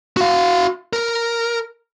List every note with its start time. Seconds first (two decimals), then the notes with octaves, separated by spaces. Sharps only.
0.17 F#4 F5
0.93 A#4